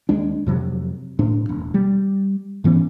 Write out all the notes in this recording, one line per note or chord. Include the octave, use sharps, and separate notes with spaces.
D#2 G#3 D4
F2 C3 F#3
A2 D4
E1
G3
G#2 E3 B3 C#4